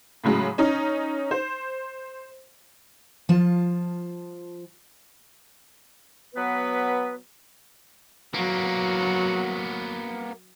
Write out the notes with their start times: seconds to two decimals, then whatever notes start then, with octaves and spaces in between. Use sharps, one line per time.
0.24 A2 C#3 F#3 G#3
0.58 C#4 D#4
1.31 C5
3.29 F3 F4 A5
6.35 F#3 B3 B4
8.34 F#3 A#3 B3